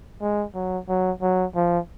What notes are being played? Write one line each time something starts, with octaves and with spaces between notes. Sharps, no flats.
G#3
F#3
F#3
F#3
F3